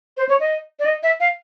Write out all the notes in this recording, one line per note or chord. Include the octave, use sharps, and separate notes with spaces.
C5
C#5
D#5
D5
D#5
E5
F5